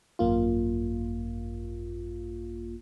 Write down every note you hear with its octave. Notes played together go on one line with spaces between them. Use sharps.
G#1 F#2 A#3 F4